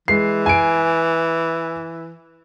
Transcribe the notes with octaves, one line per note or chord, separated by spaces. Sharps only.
E3 G#3 C7
G#5 D7